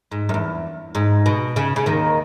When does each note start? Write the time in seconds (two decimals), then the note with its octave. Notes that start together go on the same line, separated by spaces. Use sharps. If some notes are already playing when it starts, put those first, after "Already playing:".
0.11 G#2
0.29 F#2
0.34 E2
0.95 G#2
1.26 B2
1.56 C#3
1.76 C#3
1.86 D#2 D#3